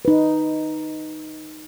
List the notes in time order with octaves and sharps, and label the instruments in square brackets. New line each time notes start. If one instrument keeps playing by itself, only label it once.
[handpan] D#4 B4